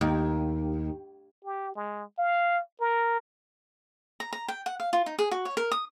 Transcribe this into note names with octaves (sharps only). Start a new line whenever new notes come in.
D#2
G4
G#3
F5
A#4
A#5
A#5
G5
F#5
F5
F4
D#4
G#4
F#4
C#5
A#4
D#6